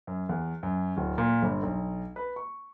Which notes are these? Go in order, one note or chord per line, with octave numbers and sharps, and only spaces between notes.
F#2
E2
F#2
D1
A#2
G1
B1
B4
C#6